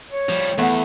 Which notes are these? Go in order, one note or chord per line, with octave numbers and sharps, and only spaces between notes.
C#5
F3 G3
E2 A3 B3